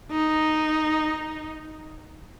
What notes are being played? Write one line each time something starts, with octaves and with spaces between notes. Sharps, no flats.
D#4